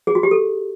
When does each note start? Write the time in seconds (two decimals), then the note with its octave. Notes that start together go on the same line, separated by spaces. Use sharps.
0.07 G#4
0.15 F#4
0.23 G4
0.31 A4